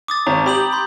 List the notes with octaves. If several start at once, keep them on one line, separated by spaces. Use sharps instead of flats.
D6 D#6 A6
G#1 A#5
G4 B5 D#6 F#7
B5 C6 G6